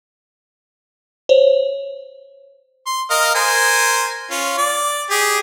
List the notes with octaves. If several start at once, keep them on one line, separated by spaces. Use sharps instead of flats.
C5 C#5
C6
A#4 D#5 F5
A#4 C5 G#5
C#4 F4
D5
G4 G#4